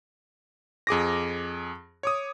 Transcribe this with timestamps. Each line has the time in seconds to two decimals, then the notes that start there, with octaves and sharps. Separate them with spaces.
0.87 F2 G#4 D6 A#6
2.03 C#5 D6 D#6